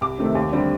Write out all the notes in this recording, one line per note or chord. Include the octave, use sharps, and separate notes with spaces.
C2 D6
C3 D#3 A3 C4
D#2
D3 G3 C4